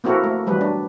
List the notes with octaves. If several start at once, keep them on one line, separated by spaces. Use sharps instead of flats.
A#3 C4 E4 F#4 A4 A#4
A3
E3 F#3 G3 B4
D4